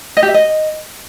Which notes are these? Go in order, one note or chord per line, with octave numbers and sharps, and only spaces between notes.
D#5
G4
E5
D#5